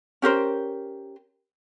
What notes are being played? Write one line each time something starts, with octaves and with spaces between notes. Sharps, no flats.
C#4 G4 A#4 C5